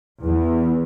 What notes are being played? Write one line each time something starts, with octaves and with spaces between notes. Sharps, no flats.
E2